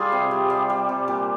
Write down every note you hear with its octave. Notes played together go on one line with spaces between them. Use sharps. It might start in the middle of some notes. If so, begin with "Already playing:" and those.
Already playing: G3 F4 G#4
C3
G3
G3
G3
C3
A#2